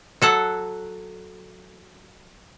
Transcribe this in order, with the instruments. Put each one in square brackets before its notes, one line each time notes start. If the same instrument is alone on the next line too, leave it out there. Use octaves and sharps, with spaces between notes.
[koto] F#3 A4 F#5